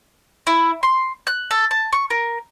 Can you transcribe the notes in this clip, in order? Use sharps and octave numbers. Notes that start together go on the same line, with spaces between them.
E4
C6
F#6
A4
A5
C#6
A#4